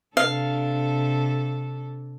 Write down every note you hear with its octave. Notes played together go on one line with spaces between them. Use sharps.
C3 D4 A4 F5